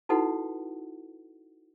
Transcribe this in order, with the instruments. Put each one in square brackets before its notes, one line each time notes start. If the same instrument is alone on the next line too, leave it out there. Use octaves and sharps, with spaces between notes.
[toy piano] D#4 E4 F#4 A4 B4 F#5